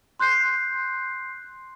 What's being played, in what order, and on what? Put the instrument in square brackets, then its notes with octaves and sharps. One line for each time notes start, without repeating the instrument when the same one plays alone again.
[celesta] C6 F#6 G6 C7